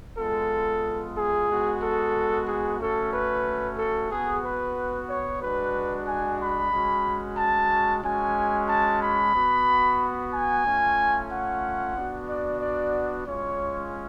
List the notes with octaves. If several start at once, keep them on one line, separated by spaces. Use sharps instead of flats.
G#3 B3 F4 A4
G#4
G#3 B3 F#4
A4
G#4
A3 C#4 F#4 A4
B4
A4
B3 F#4 G#4
B4
C#5
G#3 D4 F#4 B4
G#5
B5
G#3 C#4 F#4
A5
G#3 C#4 F#4 G#5
A5
B5
B3 F#4
G#5
A3 C#4 F4
F#5
B3 D4 F#4
D5
D5
G#3 C#4 F4 C#5